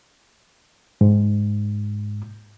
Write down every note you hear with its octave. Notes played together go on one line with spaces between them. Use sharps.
G#2